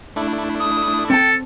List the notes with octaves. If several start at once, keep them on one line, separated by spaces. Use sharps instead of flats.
A3 D4 E4
D#6
C4 A4 G5 A5